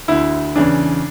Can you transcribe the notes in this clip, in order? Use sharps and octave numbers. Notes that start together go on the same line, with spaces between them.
D2 D3 E4
E2 C#3 E3 D4